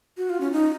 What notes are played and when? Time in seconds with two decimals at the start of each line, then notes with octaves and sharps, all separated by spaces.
0.17 F#4
0.30 F4
0.41 C#4
0.52 D#4